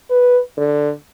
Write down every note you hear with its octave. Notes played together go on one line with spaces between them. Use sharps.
B4
D3